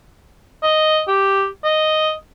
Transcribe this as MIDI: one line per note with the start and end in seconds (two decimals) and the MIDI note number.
0.63 1.01 75
1.08 1.46 67
1.64 2.12 75